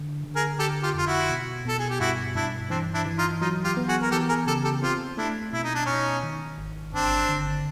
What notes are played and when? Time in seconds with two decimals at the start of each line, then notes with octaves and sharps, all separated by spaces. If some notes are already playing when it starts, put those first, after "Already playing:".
Already playing: D3
0.24 D3
0.36 G#4 A#4
0.59 D3 G4 A4
0.82 F4 G4
0.94 F2 F4
1.06 E4 F#4
1.30 B2
1.65 B2 A4
1.79 G#4
1.90 G4
2.00 G2 E4 F#4
2.35 G2 D4 E4
2.70 E3 C4 D4
2.94 D4 E4
3.06 E3
3.18 D#4 F4
3.41 F#3 D#4 F4
3.64 F4 G4
3.77 B3
3.88 F#4 G#4
4.01 A#4
4.11 E3 G4 A4
4.29 G#4 A#4
4.47 C#3 G4 A4
4.64 G4 A4
4.82 C4 F4 G4
5.17 A3 D4 E4
5.53 B2 E4
5.64 D#4
5.75 D4
5.86 B2 C#4 D#4
6.23 D#3
6.58 G#1
6.93 G1 C4 D4
7.29 D3